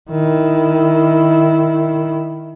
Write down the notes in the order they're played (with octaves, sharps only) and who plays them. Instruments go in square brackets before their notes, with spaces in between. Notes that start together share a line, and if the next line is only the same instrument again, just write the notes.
[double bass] D#3 E4